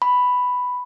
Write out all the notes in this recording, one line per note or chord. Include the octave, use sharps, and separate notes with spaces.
B5